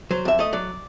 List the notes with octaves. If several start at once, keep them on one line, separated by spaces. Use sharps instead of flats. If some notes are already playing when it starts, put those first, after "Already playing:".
F#3 C5
F2 E5
A3 D#5
F#3 D5